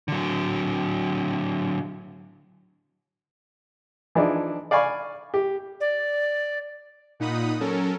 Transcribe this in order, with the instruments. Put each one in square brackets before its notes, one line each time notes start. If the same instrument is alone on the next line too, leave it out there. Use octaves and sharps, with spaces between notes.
[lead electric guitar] D3 F#3
[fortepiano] E3 F3 D4 D#4 G#4
D5 F5 G#5 B5 C#6
G4
[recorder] D5
[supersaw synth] A#2 D#4 F#5 B5 D#6
F#3 C#4 A4 A#4